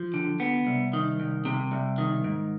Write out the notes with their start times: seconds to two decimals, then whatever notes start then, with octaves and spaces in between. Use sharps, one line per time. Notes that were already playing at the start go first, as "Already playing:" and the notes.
Already playing: F3
0.14 D3
0.40 B3
0.67 C2
0.93 D#3
1.20 C2
1.45 C3
1.72 C2
1.98 D#3
2.24 G#2